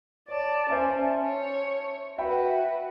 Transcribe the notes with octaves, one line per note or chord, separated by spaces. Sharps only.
C#5 D5 A5
C#4 C5 E5 A5
C#5
F#4 B4 E5 G5 B5